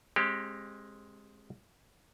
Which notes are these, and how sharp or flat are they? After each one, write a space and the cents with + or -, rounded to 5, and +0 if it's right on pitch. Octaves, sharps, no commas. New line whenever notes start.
G#3 +0 C4 +35 G4 +0